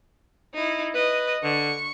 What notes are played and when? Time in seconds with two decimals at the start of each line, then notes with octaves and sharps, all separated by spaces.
0.54 D#4 E4
0.95 B4 D#5
1.44 D3 C#6